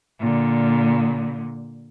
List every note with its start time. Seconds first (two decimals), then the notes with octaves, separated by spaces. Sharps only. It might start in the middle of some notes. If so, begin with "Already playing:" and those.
0.19 A#2 D3